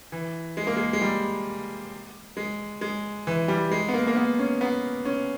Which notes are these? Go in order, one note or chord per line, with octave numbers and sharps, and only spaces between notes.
E3
G#3
A#3
G#3
G#3
G3
G#3
G#3
E3
G3
G#3
B3
A#3
A#3
B3
C#4
B3
C#4